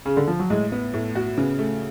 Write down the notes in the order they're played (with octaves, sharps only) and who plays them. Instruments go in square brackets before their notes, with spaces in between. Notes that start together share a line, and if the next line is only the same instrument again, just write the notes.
[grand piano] C#3
D3
F3
F#3
[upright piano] A2 [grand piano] G#3
[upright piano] B3
[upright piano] A2 [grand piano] A3
[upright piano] F#4
[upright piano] C#3 [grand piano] B3
[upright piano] A3